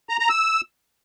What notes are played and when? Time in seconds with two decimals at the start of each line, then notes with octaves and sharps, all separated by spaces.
0.09 A#5
0.19 A#5
0.29 E6